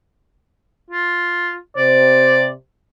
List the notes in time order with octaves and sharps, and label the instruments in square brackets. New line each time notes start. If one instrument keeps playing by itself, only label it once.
[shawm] F4
[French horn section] C3 C5 [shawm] D5